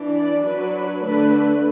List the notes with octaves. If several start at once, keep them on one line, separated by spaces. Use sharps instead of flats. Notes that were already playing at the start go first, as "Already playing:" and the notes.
Already playing: E3 D4
D5
F#3 D4 B4
D3 A3 D4 B4